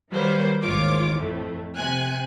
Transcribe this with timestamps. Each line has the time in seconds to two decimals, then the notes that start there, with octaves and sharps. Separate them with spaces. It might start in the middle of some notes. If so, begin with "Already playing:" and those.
0.10 D#3 F#3 G3 A#3 B4 C5
0.62 A1 D#2 G#2 F4 C#5 D6
1.17 F2 A2 A3
1.75 C3 G#5 F#6